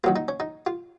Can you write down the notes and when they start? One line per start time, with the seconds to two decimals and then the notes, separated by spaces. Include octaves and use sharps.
0.04 D#3 F#3 A#3 F4
0.16 D#4
0.28 C#4
0.40 D#4
0.67 F4